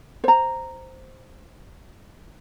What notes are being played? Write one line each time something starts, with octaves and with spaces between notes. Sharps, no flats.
C5 A#5